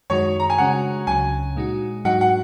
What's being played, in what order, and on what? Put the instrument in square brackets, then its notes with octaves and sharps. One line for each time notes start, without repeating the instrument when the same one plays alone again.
[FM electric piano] F#2 D#3 G#3 D#4 F#4 [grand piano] C#5
[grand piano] A#5
G#5
[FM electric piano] C#3 G#3 C#4 F#4 [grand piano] F#5
[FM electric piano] C#2 C#3 F#3 C#4 [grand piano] G#5
[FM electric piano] A#2 G#3 D#4 F#4
[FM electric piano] G#2 F#3 D#4 F#4 [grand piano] F#5
[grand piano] F#5